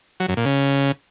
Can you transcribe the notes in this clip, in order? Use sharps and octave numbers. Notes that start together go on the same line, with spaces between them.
F#3
F#2
A#2
C#3